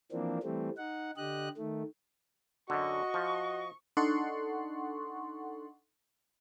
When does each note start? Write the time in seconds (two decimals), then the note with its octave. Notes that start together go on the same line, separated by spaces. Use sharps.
0.12 E3 F3 A#3 C4 D4
0.43 E3 G3 A3 C4
0.77 D#4 F#5
1.17 D3 G4 D#5 F#6
1.58 D#3 A3
2.70 F#2 D3 F#4 D#5 C#6
3.14 F3
3.97 D4 D#4 A4 F#5 C6 C#6